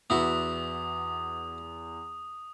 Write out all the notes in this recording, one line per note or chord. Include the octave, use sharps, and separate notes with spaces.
E2 B3 E4 F#4 D#6